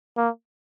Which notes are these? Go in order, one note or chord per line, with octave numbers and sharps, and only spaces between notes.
A#3